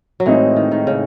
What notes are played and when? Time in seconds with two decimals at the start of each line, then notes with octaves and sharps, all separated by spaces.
0.20 F#3
0.26 A2 E3 G#3 C4 D#4 G#4
0.56 D#3
0.71 D#3
0.87 C#3